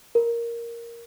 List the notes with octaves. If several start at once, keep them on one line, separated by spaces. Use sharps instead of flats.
A#4